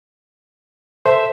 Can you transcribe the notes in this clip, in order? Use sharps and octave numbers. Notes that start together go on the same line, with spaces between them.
A4 C5 E5